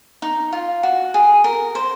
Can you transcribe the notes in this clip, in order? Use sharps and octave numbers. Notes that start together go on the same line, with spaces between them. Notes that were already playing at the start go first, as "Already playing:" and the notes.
D#4
F4
F#4
G#4
A#4
C5